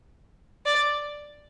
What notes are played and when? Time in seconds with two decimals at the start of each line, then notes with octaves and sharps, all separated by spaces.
0.66 D5